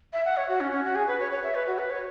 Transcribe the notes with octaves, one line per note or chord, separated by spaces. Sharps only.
E5
F#5
C#5
F#4
C#4
C#4
F#4
G#4
B4
C#5
C#5
E5
B4
F#4
B4
C#5